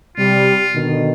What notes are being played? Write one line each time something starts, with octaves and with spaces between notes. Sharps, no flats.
C3 G3 F4
B2 D3 D#3